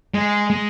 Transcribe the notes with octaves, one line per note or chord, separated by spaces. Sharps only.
G#3
G#3